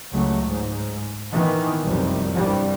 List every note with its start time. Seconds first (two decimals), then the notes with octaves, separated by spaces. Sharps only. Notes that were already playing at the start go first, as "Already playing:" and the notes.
0.13 C#2 C#3 F#3 A3
0.44 G#2
1.33 A#2 D#3 E3 B3
1.86 F1 C2 F#2 C3 D#3 G3
2.36 C2 G2 G3